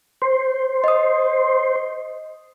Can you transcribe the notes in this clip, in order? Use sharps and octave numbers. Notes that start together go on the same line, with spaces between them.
C5
D#5 D#6